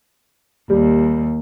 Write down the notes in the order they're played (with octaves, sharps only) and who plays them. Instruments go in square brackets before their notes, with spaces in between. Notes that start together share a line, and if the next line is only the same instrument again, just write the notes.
[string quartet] D#2 [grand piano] G3